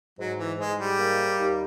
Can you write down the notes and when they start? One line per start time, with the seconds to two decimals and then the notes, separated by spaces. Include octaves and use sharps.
0.19 G#2 F#3
0.39 E3
0.58 G#2 G#3
0.79 G3
0.99 A#3
1.39 D#2